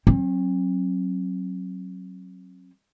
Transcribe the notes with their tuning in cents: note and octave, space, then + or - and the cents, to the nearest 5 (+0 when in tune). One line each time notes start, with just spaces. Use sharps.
F#3 +5 C4 +45